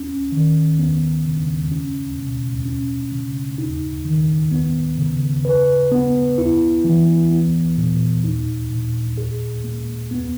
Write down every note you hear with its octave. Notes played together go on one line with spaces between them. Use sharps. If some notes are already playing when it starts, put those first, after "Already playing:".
Already playing: C#4
D#3
B3
C#3
C#4
B2
C#4
C#3
D#4
D#3
B3
C#3
B4
B3
E4
E3
B3
A#2
D#4
A#2
G#4
A#3
B3